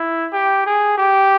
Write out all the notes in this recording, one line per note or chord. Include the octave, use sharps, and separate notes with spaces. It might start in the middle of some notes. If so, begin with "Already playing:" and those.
Already playing: E4
G4
G#4
G4